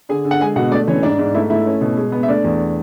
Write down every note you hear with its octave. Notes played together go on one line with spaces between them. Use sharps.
D3 G#4 G#5
D3
F#5
G#3 G#4 G#5
B2 F#4 F#5
A3 D4 D5
E3 C#4 C#5
G#2 D4 D5
G#2
A3 E4 E5
A3 E4 E5
C#4
B2
G#3
B3
E5
A3 D4 D5
E2